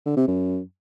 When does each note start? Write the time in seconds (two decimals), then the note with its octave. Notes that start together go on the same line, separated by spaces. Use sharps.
0.06 D3
0.17 C3
0.28 F#2